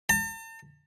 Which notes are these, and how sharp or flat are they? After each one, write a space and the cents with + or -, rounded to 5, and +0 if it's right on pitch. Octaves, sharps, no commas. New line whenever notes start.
A5 +40